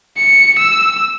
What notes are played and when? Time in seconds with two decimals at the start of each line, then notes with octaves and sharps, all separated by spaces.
0.17 C#7
0.59 E6